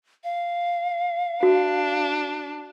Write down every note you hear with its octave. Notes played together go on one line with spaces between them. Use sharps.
F5
D4 F#4